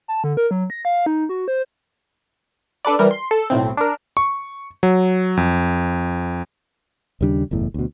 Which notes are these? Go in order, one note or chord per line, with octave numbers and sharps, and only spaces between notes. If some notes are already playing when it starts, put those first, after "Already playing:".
A5
D3
A#4
F#3
A#6
F5
D#4
F#4
C5
D4 A4 B4 D5
E3 G3 A#4
C6
A4
B1 A2 C4
D4 A#4
C#6
F#3
F2
D#2 C#3 G3 D4
F#1 E2 A2
D2 B2